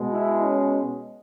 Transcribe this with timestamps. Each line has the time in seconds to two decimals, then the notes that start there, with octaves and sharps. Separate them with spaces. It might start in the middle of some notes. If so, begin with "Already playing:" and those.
Already playing: B2 G#3
0.13 E4
0.43 C#4